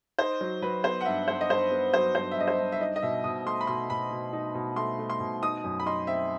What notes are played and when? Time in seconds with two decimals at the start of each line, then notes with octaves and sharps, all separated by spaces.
0.19 D#4 C5
0.41 F#3
0.62 F#3 B4
0.84 B3 C5
1.01 F#5
1.05 G2 E5
1.28 G2 C5
1.41 D#5
1.50 G2 C5
1.71 B3
1.94 F#3 C5
2.15 G2 C5
2.31 E5
2.37 G2 D#5
2.48 C5
2.59 G2
2.72 E5
2.80 D#4 D#5
2.96 D#5
3.02 B2 E5
3.24 B2 D#6
3.46 A3 C6
3.61 B5
3.67 B2 C6
3.90 B2 B5
4.11 B2
4.33 D#4
4.55 B2
4.76 A3 C6
4.99 A3
5.10 C6
5.20 B2
5.42 D#4 D#6
5.64 F#2
5.80 B5
5.86 D#4 C6
6.07 C4 E5